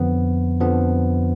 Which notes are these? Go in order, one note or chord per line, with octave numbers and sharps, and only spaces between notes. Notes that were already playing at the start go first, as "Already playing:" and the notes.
Already playing: F2 D3 F3 B3
F2 D3 F3 B3